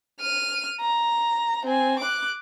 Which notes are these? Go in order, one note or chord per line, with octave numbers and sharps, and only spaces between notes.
F6 D#7
A#5
C4 G#5
D6 F#6